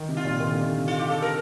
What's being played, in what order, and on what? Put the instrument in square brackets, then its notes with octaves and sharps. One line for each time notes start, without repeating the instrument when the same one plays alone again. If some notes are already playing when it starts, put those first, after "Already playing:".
Already playing: [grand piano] D#3
C3
[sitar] F4
[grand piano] A#2
D#3
D3
C3
D3
[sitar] F4
G4
A4
A#4